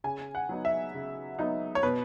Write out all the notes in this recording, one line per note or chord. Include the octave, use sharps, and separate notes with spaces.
C#3 G#5
F#5
F#3 B3 D#4
E5
C#3
F#3 B3 D#4
C#5
B2 B4